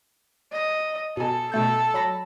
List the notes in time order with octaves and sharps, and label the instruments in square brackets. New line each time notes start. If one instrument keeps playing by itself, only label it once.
[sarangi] D#5
[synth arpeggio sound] B2 G#5 [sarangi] A4
[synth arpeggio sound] B2 A3 G6 [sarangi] A4
[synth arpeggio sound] F#3 B5 A#6